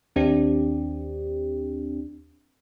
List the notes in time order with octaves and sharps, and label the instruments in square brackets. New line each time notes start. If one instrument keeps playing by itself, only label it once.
[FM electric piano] D#2 C4 D4 G4